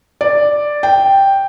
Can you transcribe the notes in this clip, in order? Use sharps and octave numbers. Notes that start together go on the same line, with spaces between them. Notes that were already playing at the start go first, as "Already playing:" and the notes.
D5
G5